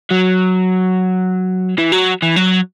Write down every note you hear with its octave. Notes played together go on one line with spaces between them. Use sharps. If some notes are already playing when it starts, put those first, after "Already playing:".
F#3
E3
F#3
E3
F#3